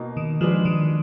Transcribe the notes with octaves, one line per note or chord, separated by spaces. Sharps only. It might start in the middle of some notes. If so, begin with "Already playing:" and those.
Already playing: B2 A#3 D#4
D#3
F3 G#3 D4 G#4 B4
D#3